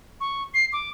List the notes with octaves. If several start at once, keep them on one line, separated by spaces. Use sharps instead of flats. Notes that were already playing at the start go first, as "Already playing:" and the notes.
C#6
C7
D6